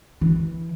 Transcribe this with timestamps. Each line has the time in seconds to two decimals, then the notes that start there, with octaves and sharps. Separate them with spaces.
0.21 E3